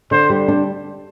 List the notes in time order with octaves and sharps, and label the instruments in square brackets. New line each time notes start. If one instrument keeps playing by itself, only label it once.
[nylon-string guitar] D3 [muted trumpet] C5
[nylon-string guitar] G3
D4